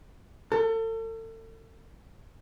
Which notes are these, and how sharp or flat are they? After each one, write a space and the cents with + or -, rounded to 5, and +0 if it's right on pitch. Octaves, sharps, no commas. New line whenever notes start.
A4 +40